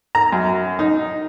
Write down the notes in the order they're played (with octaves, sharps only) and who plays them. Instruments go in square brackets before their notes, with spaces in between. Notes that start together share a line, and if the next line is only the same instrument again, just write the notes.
[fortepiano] A#5
F#2
D#4